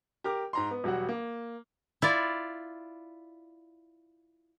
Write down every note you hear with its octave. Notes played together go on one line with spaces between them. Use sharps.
G4 A#4 D6
G#2 A#5 C6
B3
E1 F#3 G3 F#4 F#5
A#3
E4 F4 D5